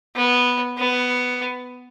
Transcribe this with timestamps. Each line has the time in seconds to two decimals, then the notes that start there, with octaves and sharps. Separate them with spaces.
0.16 B3
0.78 B3